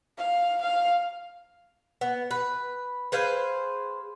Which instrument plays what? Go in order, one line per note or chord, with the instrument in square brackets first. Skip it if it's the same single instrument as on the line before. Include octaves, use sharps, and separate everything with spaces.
[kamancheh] F5
F5
[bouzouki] B3
B4
G#4 B4 C5 F5